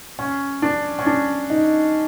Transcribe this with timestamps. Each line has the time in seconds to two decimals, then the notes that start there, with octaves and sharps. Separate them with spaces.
0.19 C#4
0.62 D4
0.99 C#4
1.06 D4
1.50 D#4